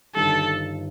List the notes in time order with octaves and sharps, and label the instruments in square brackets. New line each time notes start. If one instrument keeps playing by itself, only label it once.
[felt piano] G1 G2 D#3 [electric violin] A4